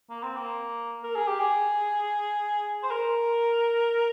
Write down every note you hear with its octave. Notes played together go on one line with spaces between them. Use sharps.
A#3
C4
A#3
A#4
G#4
G4
G#4
C5
A#4